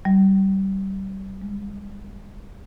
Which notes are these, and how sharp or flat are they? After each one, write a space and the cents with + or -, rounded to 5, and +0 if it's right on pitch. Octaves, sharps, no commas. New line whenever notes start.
G3 -25
G#3 -40